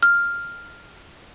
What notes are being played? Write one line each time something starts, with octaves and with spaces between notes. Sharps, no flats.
F6